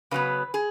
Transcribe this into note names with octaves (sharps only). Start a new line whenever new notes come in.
C#3 F#3 B3 B4
G#4